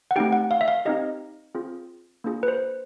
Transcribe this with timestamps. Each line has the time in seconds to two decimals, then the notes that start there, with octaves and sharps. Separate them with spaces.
0.11 F#5
0.16 A3 C4 D#4 G4 G5
0.32 F#5
0.51 F5
0.61 E5
0.68 F5
0.85 C4 D#4 G4 D#5
1.55 C4 F4 G#4
2.24 A#3 D4 F4 G#4
2.43 B4
2.48 C5